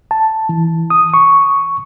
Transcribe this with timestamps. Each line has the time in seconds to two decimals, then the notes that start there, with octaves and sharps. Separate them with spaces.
0.11 A5
0.49 E3
0.90 D#6
1.14 C#6